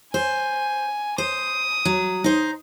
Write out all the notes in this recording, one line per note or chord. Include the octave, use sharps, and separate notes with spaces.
C5 G#5
C5 D#6
F#3
D#4 C5